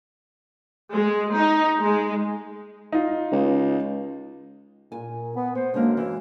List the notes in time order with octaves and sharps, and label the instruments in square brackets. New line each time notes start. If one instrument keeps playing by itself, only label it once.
[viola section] G#3
D#4
G#3
[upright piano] D#4 F4
[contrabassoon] C#2
[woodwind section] A#2 [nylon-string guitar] G#5
[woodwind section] B3
[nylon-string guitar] B3 [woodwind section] C5
[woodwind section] F#2 G#3 [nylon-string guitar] D3 A#3
[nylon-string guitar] E3